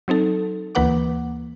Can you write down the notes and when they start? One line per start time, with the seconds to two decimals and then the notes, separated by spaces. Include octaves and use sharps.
0.08 F#3 C4 D#4 A4
0.75 D2 E3 A#3 B4 F#5 D6